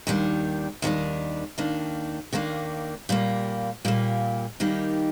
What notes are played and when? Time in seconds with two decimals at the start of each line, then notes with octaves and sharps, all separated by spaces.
0.07 D#2 D#3 G3 D4
0.82 D#2 D#3 G3 D4
1.58 D#2 D#3 A#3 D4
2.33 D#2 D#3 A#3 D4
3.09 A#2 G3 A#3
3.85 A#2 G3 A#3
4.60 D#3 G3 A#3 D#4 G4